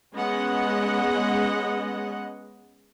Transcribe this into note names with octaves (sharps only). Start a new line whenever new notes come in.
G#3 B3 C#4 D#5 F#5